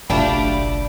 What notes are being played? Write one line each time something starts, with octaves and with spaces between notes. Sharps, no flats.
F#1 B1 A3 D4 F4 G4 G5 B5